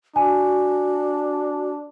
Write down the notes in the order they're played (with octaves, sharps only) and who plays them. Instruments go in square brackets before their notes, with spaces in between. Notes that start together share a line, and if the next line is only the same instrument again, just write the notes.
[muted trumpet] D4 [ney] F#4 [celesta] G#5